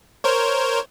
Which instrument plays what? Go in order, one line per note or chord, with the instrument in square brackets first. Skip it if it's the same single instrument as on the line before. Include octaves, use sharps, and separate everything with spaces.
[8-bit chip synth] A#4 C5 C#5